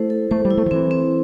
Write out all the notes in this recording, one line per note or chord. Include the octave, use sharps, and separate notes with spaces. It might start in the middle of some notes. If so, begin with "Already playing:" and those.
Already playing: A3 E4 A4 C5
A4
A3 C5
G3
E4
A3
F3
E3 C4
C4